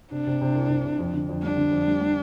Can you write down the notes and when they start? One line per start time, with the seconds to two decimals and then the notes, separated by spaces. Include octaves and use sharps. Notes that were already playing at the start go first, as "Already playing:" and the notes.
0.12 C3 D4
0.27 C3
0.41 C3
0.55 C2
0.69 C3
0.85 C3
0.99 F2
1.13 D3
1.29 F2
1.43 G3 D4
1.57 D3
1.72 F2
1.87 G3
2.01 G3